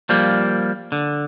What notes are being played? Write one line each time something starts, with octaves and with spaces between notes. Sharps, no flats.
F3 G3 A#3
D3